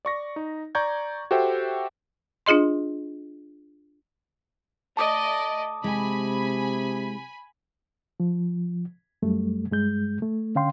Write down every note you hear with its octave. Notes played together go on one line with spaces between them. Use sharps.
D5 C#6 A#6
D#4
D5 A#5 C#6 G6 G#6
F#4 G4 A4 C5 E5 G5
D4 F4 G#4 D#5 C6
A3 D5 D#5 A5 D6 D#6
C3 G#3 E4 G#5 B5
F3
F#2 G3 A3
G2 G#3 G6
A3
D3 C#4 F5 G5 C6